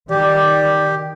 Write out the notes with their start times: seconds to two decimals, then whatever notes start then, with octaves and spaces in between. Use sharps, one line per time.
0.10 D#3 G4 D5